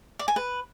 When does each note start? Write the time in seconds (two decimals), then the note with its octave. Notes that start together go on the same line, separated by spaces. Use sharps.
0.19 D5
0.28 G#5
0.36 B4